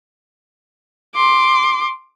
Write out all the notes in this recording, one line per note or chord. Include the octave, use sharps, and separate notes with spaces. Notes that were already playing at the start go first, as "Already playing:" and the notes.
C6 D6